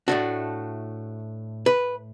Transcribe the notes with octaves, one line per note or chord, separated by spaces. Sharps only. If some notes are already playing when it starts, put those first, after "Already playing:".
A2 A3 D4 F#4
B4